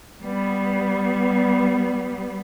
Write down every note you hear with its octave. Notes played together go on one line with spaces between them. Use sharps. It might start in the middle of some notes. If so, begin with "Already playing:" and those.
G3 B3